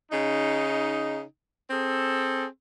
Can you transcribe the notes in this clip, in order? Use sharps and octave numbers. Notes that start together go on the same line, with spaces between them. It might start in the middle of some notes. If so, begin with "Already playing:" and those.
C#3 D#4
C4 G#4 A4